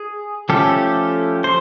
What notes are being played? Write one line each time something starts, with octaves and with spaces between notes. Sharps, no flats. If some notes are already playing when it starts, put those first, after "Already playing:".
Already playing: G#4
F3 A3 C#4 G4 A4
C5